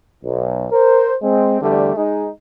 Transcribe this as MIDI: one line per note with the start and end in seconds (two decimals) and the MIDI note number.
0.24 0.65 35
0.72 1.13 70
0.72 1.13 72
1.23 1.60 56
1.23 1.60 60
1.61 1.92 40
1.61 1.92 50
1.61 1.92 55
1.61 1.92 57
1.96 2.28 56
1.96 2.28 63